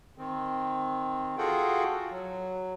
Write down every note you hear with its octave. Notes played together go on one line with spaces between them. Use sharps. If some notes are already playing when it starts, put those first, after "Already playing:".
D#3 C4
F4 F#4 G#4 A4 F#5 G5
F#3